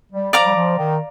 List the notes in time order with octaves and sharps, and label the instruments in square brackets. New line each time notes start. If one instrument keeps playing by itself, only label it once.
[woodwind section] G3
[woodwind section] F3 [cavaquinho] D5 F5 A#5 D6
[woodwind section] G3
F3
D#3